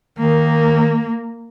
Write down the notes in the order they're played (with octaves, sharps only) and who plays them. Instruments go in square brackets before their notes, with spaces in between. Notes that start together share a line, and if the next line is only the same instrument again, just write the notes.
[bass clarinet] D#3 [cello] A#3